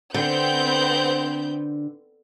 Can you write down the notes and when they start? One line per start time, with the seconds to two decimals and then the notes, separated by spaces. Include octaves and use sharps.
0.14 D3 B3 C4 G6